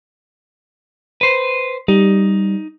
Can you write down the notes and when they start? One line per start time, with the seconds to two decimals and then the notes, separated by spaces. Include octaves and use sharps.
1.21 B4 C5
1.88 G3 D#4